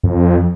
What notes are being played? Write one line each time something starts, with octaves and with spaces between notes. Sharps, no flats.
F2